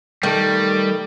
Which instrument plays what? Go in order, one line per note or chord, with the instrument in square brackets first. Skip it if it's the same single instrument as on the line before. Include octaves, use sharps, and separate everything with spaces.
[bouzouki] D#3 [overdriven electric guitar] G3 [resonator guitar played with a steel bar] A3 A4